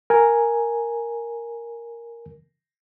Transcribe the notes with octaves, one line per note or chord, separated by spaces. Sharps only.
A#4 G#5